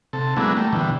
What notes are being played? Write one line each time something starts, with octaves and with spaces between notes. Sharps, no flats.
C3 A4
F#3 G#3 A#3 B3 D4 E4
G3 A3 A#3
B2 D3 E3 G3